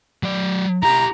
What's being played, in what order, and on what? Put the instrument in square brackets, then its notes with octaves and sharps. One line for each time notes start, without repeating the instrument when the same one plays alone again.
[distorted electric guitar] F#3 D5
[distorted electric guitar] E4 G4 [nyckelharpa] A#5